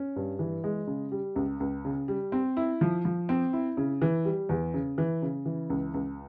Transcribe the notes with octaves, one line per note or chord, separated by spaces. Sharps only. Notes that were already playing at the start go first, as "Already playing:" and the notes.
Already playing: C#4
G2
E3
G#3
C#3
G3
C#2
C#2
C#3
G3
C4
E4
F3
F3
C4
E4
C#3
E3
G3
E2
C#3
E3
C#3
E3
C#2
C#2